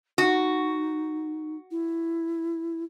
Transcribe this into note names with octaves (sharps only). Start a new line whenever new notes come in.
D#4 F#4
E4